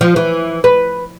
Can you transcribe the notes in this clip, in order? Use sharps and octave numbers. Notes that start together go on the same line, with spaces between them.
F3
E3
B4